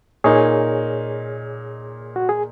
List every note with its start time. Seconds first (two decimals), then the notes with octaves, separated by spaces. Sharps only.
0.24 A#2 A#3 D#4 G#4 C#5
2.16 F#4
2.29 G#4